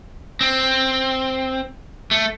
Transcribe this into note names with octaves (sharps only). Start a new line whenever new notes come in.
C4
A3